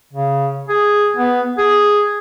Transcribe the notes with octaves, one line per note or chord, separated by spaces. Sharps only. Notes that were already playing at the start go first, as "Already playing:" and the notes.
C#3
G#4
B3
G#4